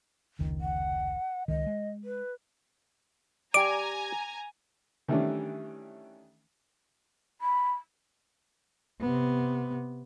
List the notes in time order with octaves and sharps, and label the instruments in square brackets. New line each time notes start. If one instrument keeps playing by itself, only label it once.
[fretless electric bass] F1 C#2 D#3
[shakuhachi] F#5
[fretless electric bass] C#2 D#3 [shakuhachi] D#5
[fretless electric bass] G#3
[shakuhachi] B4
[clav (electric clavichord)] G4 D5 [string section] G#5 A#5 [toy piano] D6 [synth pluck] D7
[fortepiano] D#3 E3 G3 A3 C#4 D4
[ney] B5
[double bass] C3 B3